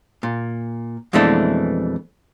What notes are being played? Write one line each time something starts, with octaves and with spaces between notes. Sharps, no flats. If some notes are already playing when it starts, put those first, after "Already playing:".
A#2
F2 B2 E3 G#3 A3 D4